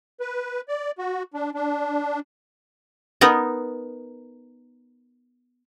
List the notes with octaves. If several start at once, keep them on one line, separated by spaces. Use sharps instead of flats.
B4
D5
F#4
D4
D4
B3 D#4 A#4